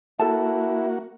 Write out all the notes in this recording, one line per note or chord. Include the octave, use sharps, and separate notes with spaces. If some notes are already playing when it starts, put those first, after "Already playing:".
A#3 E4 F#4 A4 A5